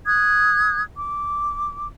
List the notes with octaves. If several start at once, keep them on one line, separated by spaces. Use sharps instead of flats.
D#6 F#6 G#6
D6